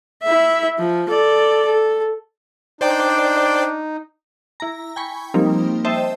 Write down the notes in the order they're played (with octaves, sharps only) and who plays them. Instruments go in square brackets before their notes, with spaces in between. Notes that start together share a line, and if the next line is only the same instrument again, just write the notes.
[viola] E4 E5
F3
A4 D5
A4
[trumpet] D4 [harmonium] D#4 [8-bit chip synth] C5 D5 G5
[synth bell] E4 A#5
G5 G#5 B5 C#6
F3 G3 A#3 C4 D#4
C5 D#5 E5 G5 A5